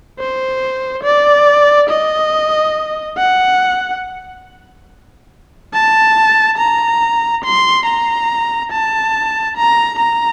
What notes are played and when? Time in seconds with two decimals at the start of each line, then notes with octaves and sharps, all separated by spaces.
0.19 C5
1.04 D5
1.90 D#5
3.17 F#5
5.73 A5
6.58 A#5
7.44 C6
7.86 A#5
8.72 A5
9.57 A#5
9.99 A#5